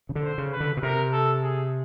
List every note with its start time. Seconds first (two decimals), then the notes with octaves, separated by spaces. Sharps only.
0.09 C#3
0.15 D3
0.22 C5
0.38 C#3
0.52 B4
0.60 D3
0.77 B2
0.82 C3 A#4
1.12 A4
1.42 G#4